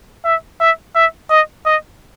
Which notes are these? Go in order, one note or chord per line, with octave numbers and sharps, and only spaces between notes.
E5
E5
E5
D#5
D#5